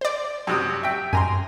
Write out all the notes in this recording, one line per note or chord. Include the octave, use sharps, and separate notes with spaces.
C5 D5
F#2 C3 D#6
E5 G5
F#2 G#5 A#5 C6